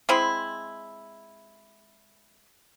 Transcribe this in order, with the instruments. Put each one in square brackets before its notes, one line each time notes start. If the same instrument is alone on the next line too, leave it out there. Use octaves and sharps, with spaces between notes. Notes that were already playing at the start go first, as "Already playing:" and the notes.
[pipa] G#3 C4 E4